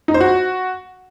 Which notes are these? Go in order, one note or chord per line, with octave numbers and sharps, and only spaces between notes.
D#4
C5
F#4